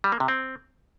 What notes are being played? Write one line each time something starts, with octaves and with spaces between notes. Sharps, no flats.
G3
A#3
C3
C4